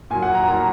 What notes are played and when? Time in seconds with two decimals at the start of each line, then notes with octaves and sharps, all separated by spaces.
0.10 A#2 F#3 G#5
0.23 F#5
0.35 A#5
0.48 A#2 F#3 A#5